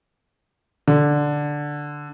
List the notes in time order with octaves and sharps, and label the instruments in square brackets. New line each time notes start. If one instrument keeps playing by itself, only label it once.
[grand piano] D3